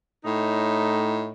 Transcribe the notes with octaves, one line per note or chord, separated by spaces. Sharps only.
A2 D#4